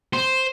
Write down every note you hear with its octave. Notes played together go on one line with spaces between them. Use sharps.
C5